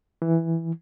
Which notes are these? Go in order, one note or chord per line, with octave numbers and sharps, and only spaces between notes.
E3